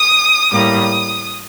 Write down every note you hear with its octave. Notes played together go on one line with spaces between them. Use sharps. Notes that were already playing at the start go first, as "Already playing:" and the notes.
Already playing: D#6
A2 G3 A#3 D#6